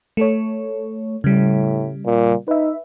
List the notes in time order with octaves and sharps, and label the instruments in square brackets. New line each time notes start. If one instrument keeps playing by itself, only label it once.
[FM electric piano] A3 A4 C#5
[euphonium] A2 [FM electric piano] C#3 G3
[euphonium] A#2
[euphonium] D#4 [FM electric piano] B4 E5